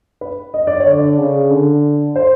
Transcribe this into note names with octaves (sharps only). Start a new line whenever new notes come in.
B4
D#5
D5
C#5
D3
D5
C#3
D3
C5